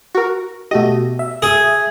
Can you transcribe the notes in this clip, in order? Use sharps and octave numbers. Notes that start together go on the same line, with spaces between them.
F#4 A#4
B2 A3 F#4 G4 D#5
E5
G#4